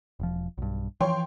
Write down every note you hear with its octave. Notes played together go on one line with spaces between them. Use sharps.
E1 F3
B1 G2
E3 F3 C#5 G5 C6